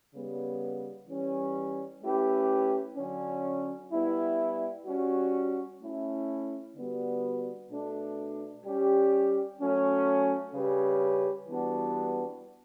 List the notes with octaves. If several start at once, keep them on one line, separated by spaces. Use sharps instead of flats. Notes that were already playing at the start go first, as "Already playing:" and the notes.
C#3 G3 B3
E3 G3 C#4
A3 C#4 E4 G4 B4
D3 F#3 C#4
G3 B3 E4
G3 C#4 F#4
A3 C#4 E4
D3 G3 B3 F#4
B2 A3 D4
G3 C#4 G4
F#3 A3 C#4
C#3 G3 C#4 G4 B4
E3 G3 B3 D4 F#4